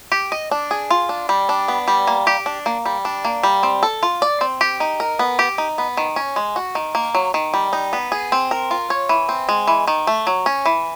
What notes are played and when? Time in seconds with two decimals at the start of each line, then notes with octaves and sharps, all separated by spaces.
0.12 G4
0.32 D#5
0.51 D4
0.71 G#4
0.90 F4
1.09 D4
1.29 G3
1.49 D4
1.68 B3
1.88 G3
2.07 A#3
2.27 G4
2.46 D4
2.66 A#3
2.85 G3
3.05 D4
3.25 A#3
3.43 G3
3.63 C4
3.83 A4
4.03 F4
4.22 D5
4.41 C4
4.61 G4
4.80 D#4
5.00 A#4
5.19 B3
5.39 G4
5.58 D#4
5.78 B3
5.97 D#3
6.16 C#4
6.36 G#3
6.56 F#4
6.75 D#3
6.95 A#3
7.15 F#3
7.34 D#3
7.54 G3
7.73 D#4
7.93 B3
8.12 G#4
8.32 C4
8.51 A#4
8.71 F4
8.90 C#5
9.09 E3
9.29 C4
9.49 G#3
9.67 E3
9.87 D#3
10.07 A3
10.27 F#3
10.46 C#4
10.66 E3